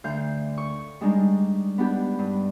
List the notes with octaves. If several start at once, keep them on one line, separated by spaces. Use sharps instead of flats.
D2 F5 G6
C#6
G3 G#3 D4 D#4
B3 D4 G4
G2